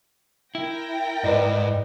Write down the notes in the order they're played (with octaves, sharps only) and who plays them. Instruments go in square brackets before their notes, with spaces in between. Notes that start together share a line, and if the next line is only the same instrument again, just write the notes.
[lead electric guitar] E4 [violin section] A#4 G5 A#6
[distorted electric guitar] G#2 [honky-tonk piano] B4 D5 D#5